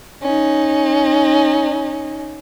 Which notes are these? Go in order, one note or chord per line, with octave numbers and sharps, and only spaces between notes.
C#4 D#4